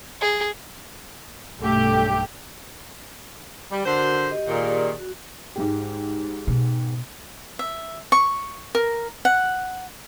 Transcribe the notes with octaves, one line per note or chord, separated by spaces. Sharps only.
G#4
B1 G2 A3 G4
G3
D3 F#4 A#4 C5
G4 D#5
A#2 D#3 G4 G#4 D5
F#4
G#2 G#3 G4
B2
E5
C#6
A#4
F#5